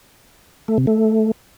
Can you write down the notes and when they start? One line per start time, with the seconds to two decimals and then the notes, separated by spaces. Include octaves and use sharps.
0.68 A3
0.78 C3
0.87 A3